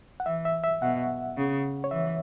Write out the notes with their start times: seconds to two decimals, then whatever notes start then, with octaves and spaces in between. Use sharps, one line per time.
0.20 F#5
0.26 E3 E5
0.45 E5
0.64 E5
0.82 B2 F#5
1.37 C#3
1.84 C#5
1.91 E3 E5